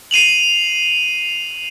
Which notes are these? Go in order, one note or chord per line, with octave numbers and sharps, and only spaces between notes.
C7 D#7 F7 F#7